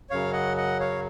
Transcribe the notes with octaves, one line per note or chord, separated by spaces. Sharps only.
F#2 C#3 F#3 C#5 F5
D#5 F#5
D#5 F#5
C#5 F5